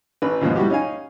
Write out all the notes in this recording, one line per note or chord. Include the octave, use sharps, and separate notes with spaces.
A1 B4
D#2 G#2 B2 F3
G3 E4 F#4 G4
C#4 D#4 F5 G#5